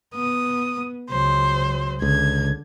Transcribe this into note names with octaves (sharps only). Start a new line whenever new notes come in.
B3 D#6
C#2 F#3 C5
C#2 D3 G#6